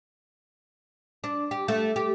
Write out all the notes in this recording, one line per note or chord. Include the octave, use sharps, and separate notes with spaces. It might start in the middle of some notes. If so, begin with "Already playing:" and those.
D4
G4
A3
G4